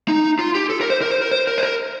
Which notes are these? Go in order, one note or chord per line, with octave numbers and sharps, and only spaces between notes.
D#4
F4
G4
A4
A#4
C5
A#4
C5
A#4
C5
A#4
C5
A#4